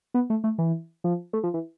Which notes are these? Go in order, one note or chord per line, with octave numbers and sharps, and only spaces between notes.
B3
A3
A3
E3
F3
A3
F3
E3